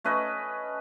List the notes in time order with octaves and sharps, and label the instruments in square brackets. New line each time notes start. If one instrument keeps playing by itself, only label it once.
[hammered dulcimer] A3 C#4 B4 D#5